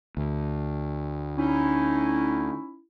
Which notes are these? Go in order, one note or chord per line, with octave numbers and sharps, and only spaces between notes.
D2
C#4 D#4 E4